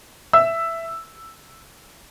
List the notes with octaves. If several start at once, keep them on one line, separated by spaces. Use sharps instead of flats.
E5 E6